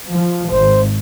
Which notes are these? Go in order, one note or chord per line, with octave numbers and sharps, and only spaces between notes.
F3
G#1 C5